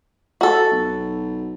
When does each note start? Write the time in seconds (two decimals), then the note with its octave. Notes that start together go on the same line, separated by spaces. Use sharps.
0.41 F#4 A4
0.72 B1